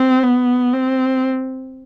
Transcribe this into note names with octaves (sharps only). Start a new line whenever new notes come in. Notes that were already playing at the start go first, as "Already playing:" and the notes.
Already playing: C4
B3
C4